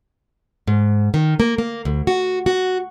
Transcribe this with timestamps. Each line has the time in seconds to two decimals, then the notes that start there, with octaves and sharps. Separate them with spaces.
0.67 G#2
1.14 D#3
1.40 A#3
1.58 A#3
1.85 D2
2.07 F#4
2.46 F#4